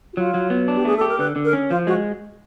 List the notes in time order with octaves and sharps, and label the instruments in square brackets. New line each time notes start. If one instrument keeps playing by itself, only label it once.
[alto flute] F#4
[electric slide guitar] F#3 [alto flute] F4
[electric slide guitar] F#3
B3
D4
[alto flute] G4
[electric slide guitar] A3 [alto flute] G#4
[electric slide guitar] G4 [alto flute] A4
[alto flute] A#4
[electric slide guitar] D3 [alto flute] B4
[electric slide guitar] D3
[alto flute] A#4
[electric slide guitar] C#4
[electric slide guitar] F3 [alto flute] F4
[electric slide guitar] G#3 [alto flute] F#4